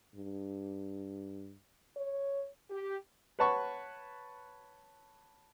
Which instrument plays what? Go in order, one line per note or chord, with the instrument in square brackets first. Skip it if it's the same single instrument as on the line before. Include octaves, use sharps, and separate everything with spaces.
[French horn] G2
C#5
[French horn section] G4
[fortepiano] B4 C#5 F#5 A5 B5 C#6